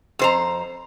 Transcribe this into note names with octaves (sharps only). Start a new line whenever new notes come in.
F2 C5 A#5